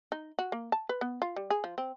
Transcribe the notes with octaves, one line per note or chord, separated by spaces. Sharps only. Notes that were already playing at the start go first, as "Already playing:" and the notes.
D#4
F#4
A#3
A5
B4
B3
F4
G3
G#4
F3
C4